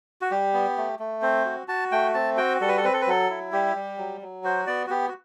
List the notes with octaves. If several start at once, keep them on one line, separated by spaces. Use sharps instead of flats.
F#4
G3 G4
B3
A3
A3
C4 C5
F#4
F#4 A5
A3 G5
C4 A5
F#4 G5
G3 A4
B4
A4
C4 B4
A4
B4
F#3 A4
E4
G3 G4
G3
F#3
F#3
F#4 C5
B3 D5
F#4
B3 G4
F#4